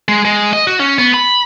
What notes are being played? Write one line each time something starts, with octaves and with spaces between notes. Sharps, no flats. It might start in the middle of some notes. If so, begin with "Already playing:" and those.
G#3
G#3
D#5
F#4
C#4
B3
B5